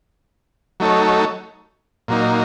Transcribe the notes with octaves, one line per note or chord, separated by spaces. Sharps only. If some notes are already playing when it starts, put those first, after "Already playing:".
F#3 A3 D#4 A4 C#5
A#2 F#3 A#3 D#4